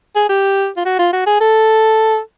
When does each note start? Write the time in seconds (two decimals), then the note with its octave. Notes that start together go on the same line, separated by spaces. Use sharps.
0.16 G#4
0.29 G4
0.77 F4
0.85 F#4
0.99 F4
1.13 F#4
1.27 G#4
1.41 A4